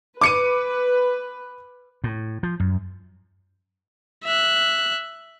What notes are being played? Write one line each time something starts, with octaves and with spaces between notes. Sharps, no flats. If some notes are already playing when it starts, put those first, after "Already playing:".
B4 D6 C#7 D#7
A2
F3
F#2
E5 F#6